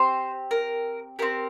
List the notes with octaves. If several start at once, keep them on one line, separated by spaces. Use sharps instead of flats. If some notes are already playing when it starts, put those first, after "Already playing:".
Already playing: C4 G4 C5
A#4
C4 G4 A#4